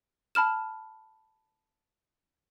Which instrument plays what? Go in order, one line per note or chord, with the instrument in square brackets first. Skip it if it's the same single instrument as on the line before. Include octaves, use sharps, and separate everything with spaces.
[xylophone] A5 B5 F6 E7